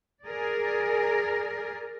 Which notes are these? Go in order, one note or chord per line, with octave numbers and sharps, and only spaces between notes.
G#4 A#4 D5